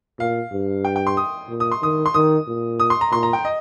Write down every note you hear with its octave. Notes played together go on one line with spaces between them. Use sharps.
A#2 F5
G2
G5
G5
C6
D#6
A#2
D#6
C6
D#3 D#6
C6
D#3 D#6
A#2
D#6
C6
A#5
A#2 C6
A#5
G5
D#5